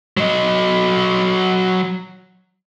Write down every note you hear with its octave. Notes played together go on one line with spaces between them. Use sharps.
F#3 D#5